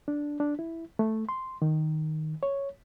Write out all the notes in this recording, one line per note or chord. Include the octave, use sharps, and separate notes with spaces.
D4
D4
E4
A3
C6
D#3
C#5